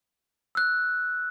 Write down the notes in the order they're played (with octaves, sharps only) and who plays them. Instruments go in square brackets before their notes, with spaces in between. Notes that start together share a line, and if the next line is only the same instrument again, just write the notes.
[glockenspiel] E6 F#6